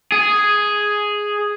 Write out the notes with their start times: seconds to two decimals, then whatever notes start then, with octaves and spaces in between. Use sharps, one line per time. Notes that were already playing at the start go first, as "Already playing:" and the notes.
0.12 G#4